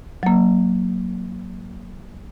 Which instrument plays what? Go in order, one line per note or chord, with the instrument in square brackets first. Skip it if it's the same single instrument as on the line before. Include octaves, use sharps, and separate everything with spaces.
[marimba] F#3 A#3